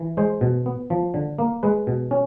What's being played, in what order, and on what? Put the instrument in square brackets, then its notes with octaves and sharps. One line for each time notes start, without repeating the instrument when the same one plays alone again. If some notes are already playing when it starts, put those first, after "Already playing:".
Already playing: [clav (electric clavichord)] E3
G#3 C5
B2
B3
F3
D3
A#3
G#3 B4
B2
C#4